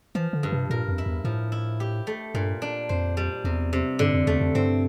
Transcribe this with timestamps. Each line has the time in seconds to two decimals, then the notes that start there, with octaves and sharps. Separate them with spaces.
0.15 E3 F3
0.33 D3
0.43 G2
0.52 C3
0.70 A#2 A#4
0.88 F2
0.98 E4
1.06 E2
1.24 A2 F3
1.52 E4
1.80 G4
2.07 A3
2.34 G2 A#2
2.62 D4
2.89 F2 C5
3.17 G3
3.44 E2 C3
3.73 C3
3.99 G2 D3
4.13 F2
4.27 E2 A3
4.41 F2
4.55 G2 C4